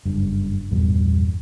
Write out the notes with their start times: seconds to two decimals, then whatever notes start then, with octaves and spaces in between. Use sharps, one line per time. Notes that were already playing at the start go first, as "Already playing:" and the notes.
0.05 F#1 G2
0.71 A#1 E2 G2 G3